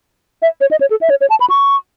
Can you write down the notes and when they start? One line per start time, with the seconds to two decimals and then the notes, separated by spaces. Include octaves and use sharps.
0.42 E5
0.61 C#5
0.71 D#5
0.81 C#5
0.90 A4
1.01 E5
1.10 C#5
1.21 C#5
1.30 A5
1.40 B5
1.50 C#6